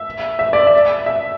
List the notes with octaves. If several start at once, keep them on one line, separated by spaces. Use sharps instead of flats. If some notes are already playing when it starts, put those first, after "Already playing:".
Already playing: E5
E5
D5
E5
E5